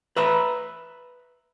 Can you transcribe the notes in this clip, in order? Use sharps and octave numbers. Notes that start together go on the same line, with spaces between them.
B4 E5 A#5 B5